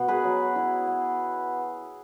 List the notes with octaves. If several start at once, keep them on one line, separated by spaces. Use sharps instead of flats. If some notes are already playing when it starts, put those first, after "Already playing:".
Already playing: B2 B3
G#4 B4
F#3
E4
B3